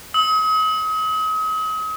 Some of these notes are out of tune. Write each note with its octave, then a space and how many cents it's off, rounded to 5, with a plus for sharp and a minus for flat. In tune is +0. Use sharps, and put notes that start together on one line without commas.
D#6 +40